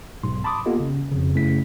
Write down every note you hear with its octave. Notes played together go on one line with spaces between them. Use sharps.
B1 G#2 C6
A5 B5 C6 D6 D#6
A#3 B3 F4 G4 A4 D#5
C#3 C#4
F2 C#3
F#2 C#3 A3 C#4 E4 B6